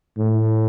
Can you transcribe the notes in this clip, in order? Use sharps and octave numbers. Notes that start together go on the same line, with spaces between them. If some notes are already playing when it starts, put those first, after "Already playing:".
A2